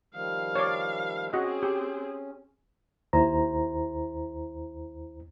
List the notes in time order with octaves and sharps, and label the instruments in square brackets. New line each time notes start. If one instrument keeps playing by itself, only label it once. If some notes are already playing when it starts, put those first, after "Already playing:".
[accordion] D#3 F3 G3 [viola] F5
[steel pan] C#5 D5
[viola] C4 G#4 [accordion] C#4 [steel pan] F#4 D#5
[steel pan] G4
[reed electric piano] D#2 E4 C5 A#5